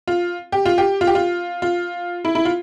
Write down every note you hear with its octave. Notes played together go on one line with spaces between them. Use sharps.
F4
G4
F4
G4
F4
G4
F4
F4
E4
E4
F4